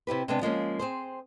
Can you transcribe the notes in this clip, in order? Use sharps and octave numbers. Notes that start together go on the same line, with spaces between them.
C3 E4 G4 B4
C3 G#3 B3 D4
F3 G#3 A#3 C#4
C4 G#4 C5